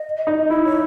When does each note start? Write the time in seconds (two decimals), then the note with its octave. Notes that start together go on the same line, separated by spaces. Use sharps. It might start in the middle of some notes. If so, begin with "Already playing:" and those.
Already playing: D#5
0.27 D#4
0.50 E4 D#5
0.65 C#5